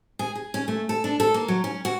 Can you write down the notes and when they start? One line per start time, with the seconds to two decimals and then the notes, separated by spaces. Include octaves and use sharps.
0.19 G#4
0.35 G#4
0.54 C#4
0.68 A3
0.89 A4
1.04 D4
1.20 A4
1.34 A#3
1.48 F#3
1.64 C#4
1.85 F#4